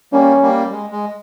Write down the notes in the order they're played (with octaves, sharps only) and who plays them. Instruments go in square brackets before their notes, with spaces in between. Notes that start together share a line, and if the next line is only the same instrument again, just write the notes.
[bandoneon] G3 A#3 [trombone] C#4
[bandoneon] G3 A#3
G#3
G#3